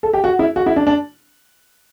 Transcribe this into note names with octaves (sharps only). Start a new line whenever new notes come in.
A4
G4
F#4
E4
F#4
E4
D4
D4